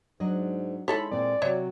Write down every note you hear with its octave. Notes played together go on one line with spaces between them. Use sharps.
G#2 F#3 D4 D#5
E3 G#3 D#4 A4 C#5 B5
A#2 A#3 C4 D5
C3 F#3 B4 C#5 E5